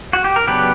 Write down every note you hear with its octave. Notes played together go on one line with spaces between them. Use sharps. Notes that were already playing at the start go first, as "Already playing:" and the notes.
F#4
G4
A#4
C#3 F#3 B3 D4 G4 B4